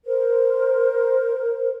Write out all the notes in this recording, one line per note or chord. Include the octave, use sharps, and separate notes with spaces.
A#4 C5